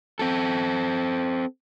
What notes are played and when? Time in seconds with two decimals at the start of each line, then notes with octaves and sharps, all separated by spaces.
0.19 C4 A4